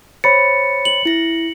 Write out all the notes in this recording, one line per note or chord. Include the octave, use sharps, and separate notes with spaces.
C5 C#5 B5 A6 C#7
F#7
E4 A#6